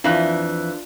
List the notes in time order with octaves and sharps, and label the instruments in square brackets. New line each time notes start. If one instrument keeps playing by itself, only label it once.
[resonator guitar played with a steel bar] F2 E3 [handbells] D4 F4